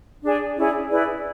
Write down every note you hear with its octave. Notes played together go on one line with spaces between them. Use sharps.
D4 G#4 D5
C#4 E4 G#4 D5
E4 G#4 B4 D5